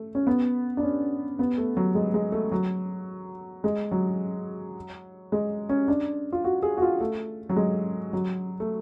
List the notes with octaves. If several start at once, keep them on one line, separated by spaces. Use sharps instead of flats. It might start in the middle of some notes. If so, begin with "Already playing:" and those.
Already playing: A3
C#4
B3
D4
C#4
B3
A3
F#3
G#3
G#3
A3
F#3
G#3
F#3
G#3
C#4
D4
F4
F#4
G#4
F#4
F4
A3
F#3
G#3
F#3
A3